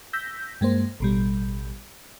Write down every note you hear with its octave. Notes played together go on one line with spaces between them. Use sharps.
E6 G6 A#6 B6
G2 G#3 A#3 C5
A1 B2 G3